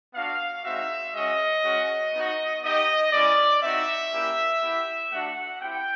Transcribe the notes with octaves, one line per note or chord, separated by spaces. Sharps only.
B3 D4 F#4 F5
G#3 C4 D#4 F#4 E5
G#3 C#4 F#4 D#5
G#3 C#4 F#4
B3 D#4 F#4
B3 D#4 G4 D#5
G#3 C#4 E4 D5
C4 D#4 F#4 E5
A#3 C#4 E4 G4
B3 E4 G4
A3 D4 F#4 F#5
C4 E4 G4 G5